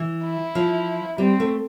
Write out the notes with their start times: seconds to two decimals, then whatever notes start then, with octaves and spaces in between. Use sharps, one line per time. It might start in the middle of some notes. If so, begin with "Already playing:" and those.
Already playing: E3
0.24 E4
0.55 F3
1.18 G3 C4
1.40 A3